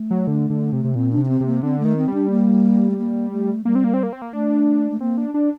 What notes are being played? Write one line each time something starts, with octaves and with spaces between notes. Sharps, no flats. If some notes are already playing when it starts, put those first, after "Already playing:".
Already playing: A3
F#3
D3
D3
C3
C3
A#2 C4
D4
C3
D4
C4
C3
A#3
D3 C4
A3
D#3
C4
G3
D4
A#3
A3
A#3
A3
G3 A#3
C4
A#3
C4
A#3
C4
A#3
A3 D4
A3
A#3 C4
D4
D4